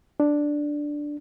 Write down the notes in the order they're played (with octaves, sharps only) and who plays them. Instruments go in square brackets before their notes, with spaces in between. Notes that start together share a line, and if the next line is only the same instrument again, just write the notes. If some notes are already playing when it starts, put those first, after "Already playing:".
[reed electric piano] D4